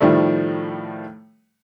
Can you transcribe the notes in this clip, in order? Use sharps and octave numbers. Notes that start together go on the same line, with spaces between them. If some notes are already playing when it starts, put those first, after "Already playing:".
A2 D#3 F3 G3 A3